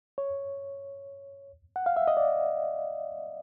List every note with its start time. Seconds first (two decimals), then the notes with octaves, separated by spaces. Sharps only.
0.18 C#5
1.76 F#5
1.86 F5
1.96 E5
2.08 D#5
2.17 D5